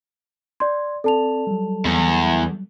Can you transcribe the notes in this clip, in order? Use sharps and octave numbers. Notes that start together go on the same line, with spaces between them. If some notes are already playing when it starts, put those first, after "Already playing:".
D5 C6 G#6
C4 A4 D5 A5 F7
F#3 G3
E2